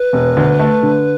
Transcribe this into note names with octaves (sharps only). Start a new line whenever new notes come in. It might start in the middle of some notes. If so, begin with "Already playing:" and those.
Already playing: B4
E1
D2
A3
D3